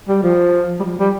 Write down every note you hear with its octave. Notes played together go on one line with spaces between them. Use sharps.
G3
F3
G3
F3
G3